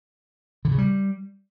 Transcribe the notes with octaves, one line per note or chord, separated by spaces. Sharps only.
D3
C#3
G3